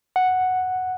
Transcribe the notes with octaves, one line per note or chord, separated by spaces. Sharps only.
F#5